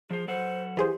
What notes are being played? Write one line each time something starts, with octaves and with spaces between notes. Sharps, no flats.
F3 G#4 C5
F#3 A4 C5 F#5
E3 G4 G#4 C5